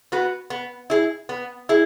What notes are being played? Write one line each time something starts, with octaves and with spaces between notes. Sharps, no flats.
B3 F#4 B4
B3
E4 G#4
B3
E4 G#4